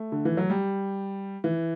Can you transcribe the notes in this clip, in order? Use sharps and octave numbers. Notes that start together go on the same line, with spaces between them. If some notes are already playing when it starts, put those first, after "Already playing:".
Already playing: A3
D3
E3
F#3
G3
E3